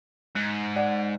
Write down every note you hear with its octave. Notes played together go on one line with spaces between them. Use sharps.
G#2 F#6
D5 F#5